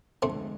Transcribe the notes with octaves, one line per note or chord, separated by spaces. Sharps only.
E2 D3 F3 G#3 A3 C4